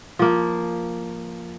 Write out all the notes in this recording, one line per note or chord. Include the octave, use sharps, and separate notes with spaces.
F3 A#3